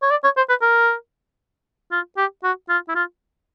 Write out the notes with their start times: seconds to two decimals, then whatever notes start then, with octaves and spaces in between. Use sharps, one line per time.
0.02 C#5
0.11 D5
0.24 C#5
0.37 C5
0.49 B4
0.62 A#4
1.92 F4
2.17 G4
2.44 F#4
2.69 F4
2.89 E4
2.95 F4